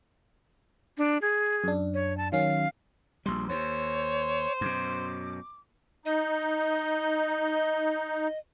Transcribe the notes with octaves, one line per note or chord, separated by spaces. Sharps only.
D4
G#4
F#2 D4
C#5
A5
D#3 F#3 C#4 F5
A#1 G3 C6
D#2 C5 C#5
F#2 B2 D6
D#4 D#5